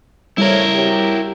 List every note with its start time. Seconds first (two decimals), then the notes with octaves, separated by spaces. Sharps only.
0.38 F3 G3 A3 E4 A#4 C#5
0.74 F#3 C4 G4